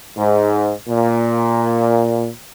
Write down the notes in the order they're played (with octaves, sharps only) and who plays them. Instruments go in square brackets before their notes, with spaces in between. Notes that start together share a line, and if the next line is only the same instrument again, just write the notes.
[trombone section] G#2
A#2